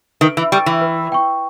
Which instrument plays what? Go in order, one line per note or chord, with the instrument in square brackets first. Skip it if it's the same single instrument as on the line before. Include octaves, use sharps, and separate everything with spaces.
[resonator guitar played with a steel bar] D#3 [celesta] B4
[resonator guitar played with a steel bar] E3
[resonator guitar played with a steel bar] G3 [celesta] G5 C#6
[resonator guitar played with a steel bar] E3
[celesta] B4
G5 C#6